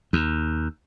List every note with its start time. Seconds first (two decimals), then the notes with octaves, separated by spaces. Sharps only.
0.13 D#2